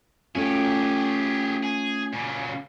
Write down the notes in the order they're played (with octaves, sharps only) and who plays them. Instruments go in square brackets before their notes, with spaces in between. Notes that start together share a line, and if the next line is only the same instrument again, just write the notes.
[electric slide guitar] A3 C#4 F4 [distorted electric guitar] G4 G#4
[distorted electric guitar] G#4
A#2 C#3